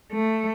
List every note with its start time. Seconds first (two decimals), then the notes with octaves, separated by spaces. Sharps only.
0.13 A3